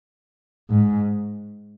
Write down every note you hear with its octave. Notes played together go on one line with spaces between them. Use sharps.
G#2